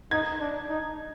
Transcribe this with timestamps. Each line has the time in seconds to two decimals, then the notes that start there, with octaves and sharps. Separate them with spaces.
0.11 D#4 G#6
0.40 D4
0.69 D#4